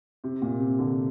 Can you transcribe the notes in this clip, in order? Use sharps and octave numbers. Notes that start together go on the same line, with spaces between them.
C3
A#2
C3
D3